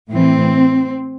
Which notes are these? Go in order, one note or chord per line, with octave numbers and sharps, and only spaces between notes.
A2 E3 C4